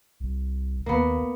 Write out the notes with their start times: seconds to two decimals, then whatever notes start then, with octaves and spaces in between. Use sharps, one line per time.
0.20 C2
0.86 D#2 A#3 B3